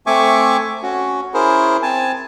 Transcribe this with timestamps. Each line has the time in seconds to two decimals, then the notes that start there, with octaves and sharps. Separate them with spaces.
0.07 A3 C4 E5 G#5 C#6 D6
0.83 C#4 F#4
1.34 C#4 E4 G#4 A#4 C5
1.83 C4 G#5 A5